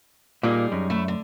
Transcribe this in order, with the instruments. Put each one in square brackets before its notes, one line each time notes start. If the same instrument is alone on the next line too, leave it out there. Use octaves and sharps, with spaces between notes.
[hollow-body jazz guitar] A#2 [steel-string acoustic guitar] G3 D#4 G#4
[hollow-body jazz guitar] F#2
[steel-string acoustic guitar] A3 E4
D3